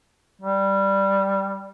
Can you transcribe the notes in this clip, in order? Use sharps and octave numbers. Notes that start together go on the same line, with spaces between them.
G3